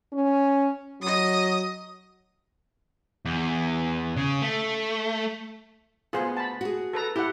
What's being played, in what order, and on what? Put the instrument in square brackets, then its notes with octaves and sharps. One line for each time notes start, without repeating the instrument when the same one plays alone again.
[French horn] C#4
[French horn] F#3 [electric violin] D#5 D#6
[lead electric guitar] E2
C#3
A3
[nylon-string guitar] D2 B3 F#5 [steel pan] F4 G#4 C5
[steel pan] A5 B5
[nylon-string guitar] F#4 G#4
[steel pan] A4 B4 A#5
[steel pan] E4 F#5 [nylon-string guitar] G4